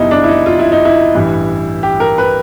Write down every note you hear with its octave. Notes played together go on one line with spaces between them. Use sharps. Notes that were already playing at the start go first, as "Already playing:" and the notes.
Already playing: F#1 E2 B2 G3 D#4 E4
D4
E4
D#4
F4
E4
D#4
E4
A1 G2 E3 G3
G4
A#4
B4